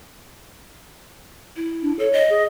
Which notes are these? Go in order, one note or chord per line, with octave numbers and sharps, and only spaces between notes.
E4
D4
A4 C#5
D#5
G#4